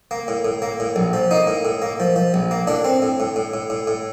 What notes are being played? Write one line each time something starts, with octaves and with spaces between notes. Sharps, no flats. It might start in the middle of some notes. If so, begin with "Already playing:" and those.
A#3
A2
A2
A#3
A2
A#1
F3
A#3 D#4
A2
A2
A#3
F3
F3
A#1
A#3
A2 D4
C4
A2
A2
A2
A2
A2
A2